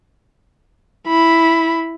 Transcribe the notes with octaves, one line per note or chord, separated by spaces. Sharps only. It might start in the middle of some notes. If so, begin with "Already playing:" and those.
E4 B5